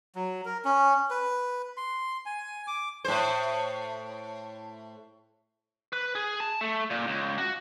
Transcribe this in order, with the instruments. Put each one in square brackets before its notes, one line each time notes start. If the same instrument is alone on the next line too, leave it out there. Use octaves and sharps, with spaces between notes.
[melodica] F#3
A#4
C#4
B4
C6
G#5
D6
[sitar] A2 C5
[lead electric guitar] B4
G#4
A5
A3
A#2
C#2
F#4